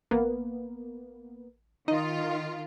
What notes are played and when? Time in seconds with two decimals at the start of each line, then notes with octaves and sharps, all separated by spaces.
0.11 A1 A#3 B3
1.88 D#3 D#4 F4 D#5